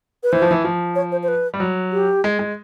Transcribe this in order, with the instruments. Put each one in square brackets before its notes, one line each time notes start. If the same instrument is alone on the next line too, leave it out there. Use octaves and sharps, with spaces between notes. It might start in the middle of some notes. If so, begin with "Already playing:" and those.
[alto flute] B4
[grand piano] E3 [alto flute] C5
[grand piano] F3
E3
F3
[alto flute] C#5
C5
C5
B4
[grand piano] G3
F#3
[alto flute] G4
[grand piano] G#3
G#3